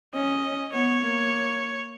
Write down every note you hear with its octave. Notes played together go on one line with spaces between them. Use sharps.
C#4 D#5
B3 C#5
A#3